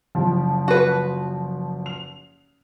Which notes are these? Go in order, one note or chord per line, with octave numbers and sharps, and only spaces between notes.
F#1 F3
F#4 B4
F7